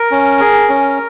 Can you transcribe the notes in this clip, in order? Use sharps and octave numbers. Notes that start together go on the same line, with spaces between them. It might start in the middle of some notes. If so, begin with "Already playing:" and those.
Already playing: A#4
C#4
G#4
C#4